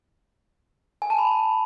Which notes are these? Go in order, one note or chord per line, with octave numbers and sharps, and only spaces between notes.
G#5
A5
B5